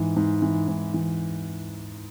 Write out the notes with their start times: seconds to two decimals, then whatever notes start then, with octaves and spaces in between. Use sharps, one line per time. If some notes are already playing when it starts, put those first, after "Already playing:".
Already playing: G#2 E3
0.16 G#2
0.42 E3
0.68 G#2
0.94 E3